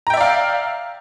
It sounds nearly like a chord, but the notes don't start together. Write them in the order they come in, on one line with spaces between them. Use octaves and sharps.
A#5 G5 E5 D5 F5